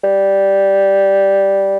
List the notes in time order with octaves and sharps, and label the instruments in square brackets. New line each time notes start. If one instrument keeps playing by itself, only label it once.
[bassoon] G3